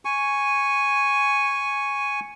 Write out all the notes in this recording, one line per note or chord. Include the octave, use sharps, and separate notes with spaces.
G#5 C#6